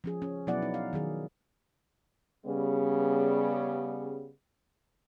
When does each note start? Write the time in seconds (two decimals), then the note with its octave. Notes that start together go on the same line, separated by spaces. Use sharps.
0.04 F3 C#4 G#4
0.22 C#4
0.47 B2 F#3 B3 E4 D5 F#5
0.62 D#4
0.74 F5
0.93 D#3 F#3 G#4
2.46 C#3 G3 B3